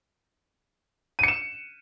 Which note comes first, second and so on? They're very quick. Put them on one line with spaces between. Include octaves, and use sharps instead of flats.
D#7 C#7 E7